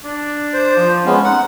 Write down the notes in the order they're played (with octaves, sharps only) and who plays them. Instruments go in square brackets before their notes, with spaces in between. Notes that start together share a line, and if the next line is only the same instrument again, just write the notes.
[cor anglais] D4
[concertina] C5
[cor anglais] F3
[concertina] G#3 B3 C#4
[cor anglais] D#4 [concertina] F#5